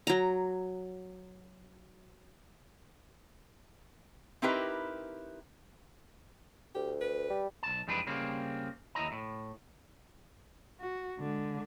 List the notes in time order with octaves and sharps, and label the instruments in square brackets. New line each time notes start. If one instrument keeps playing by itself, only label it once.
[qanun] F#3 A#5
[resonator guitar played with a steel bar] C4 D#4 E4 G4 A#4 B4
[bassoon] D2 [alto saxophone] G4
[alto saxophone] B4
[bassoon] G3
[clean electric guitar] B1 A5
F2 E3 G3 G#3 D4 B4
C#3 G3 A#3 C4
D#2 E4 D#5 A#5
A2
[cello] F#4
D3 G#3